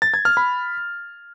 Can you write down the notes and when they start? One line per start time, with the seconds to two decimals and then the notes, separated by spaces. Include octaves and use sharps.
0.02 A6
0.14 G#6
0.25 F6
0.37 B5